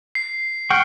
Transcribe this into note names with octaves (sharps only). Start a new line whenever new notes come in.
C7
F#5 G5 C#6 F6